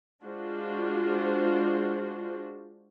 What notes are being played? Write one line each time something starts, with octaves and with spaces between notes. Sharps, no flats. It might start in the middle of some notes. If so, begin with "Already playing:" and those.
G#3 D4 F4 F#4 C5